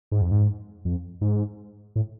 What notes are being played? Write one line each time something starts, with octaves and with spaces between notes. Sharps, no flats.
G#2
F2
G#2
F2
G#2
A2